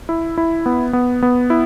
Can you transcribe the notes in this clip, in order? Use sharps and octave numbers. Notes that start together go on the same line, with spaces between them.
E4
E4
B3
B3
B3
E4